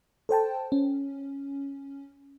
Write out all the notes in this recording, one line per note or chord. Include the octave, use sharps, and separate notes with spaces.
A4 C5 G5 A5
C#4